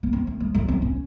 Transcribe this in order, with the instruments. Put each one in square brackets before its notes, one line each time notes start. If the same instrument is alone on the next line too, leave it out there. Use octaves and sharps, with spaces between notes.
[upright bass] A#3
C4
A#3
G#3
F#3
C4
C#4